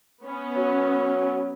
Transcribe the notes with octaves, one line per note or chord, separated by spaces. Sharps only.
B3 C#4
F#3